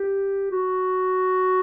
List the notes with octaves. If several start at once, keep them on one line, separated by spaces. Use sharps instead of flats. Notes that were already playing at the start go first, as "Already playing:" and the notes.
Already playing: G4
F#4